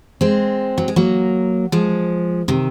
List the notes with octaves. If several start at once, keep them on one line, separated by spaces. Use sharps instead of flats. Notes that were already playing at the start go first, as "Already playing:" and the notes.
G#3 C4
F#3
G#3
F#3 A#3
F3 G#3
C3 D#3